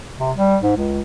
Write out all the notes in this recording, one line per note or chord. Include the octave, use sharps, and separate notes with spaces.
C3
G3
G#2
C#2